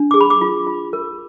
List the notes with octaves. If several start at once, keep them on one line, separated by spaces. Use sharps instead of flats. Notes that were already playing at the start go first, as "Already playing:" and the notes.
Already playing: D4
G#4 D6
B5
D6
F4
F4
A#4